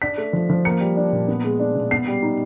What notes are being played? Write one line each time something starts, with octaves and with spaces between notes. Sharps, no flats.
D4 B6
A3
F3
F3
A#3 C#7
G3
D4
A#2
B3
G#3
D4
B2
B3 C7
G3
D#4